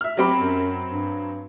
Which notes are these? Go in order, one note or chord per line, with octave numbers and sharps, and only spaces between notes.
E5 F6
F#3 C4 G4 B5
F#2
G2